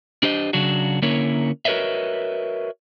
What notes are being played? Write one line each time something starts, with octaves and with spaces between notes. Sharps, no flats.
D4 G4 C5 D#5
C#3 F#3 D4 F#4
D3 A#3 C#4 E4 A#4 C#5
F#4 A#4 B4 C#5 D#5 E5